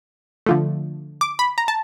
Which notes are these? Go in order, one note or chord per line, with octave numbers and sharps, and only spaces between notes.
D3 F3 A3
D6
B5
A#5
A5